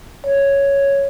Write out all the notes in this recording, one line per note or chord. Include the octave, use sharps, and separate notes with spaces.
C#5